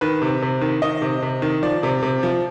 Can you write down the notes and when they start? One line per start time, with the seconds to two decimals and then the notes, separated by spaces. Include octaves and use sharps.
0.01 D#3 B4
0.22 C3
0.42 C3
0.61 D#3
0.82 D#3 D#5
1.02 C3
1.22 C3
1.42 D#3
1.63 F3 D5
1.83 C3
2.03 C3
2.23 F3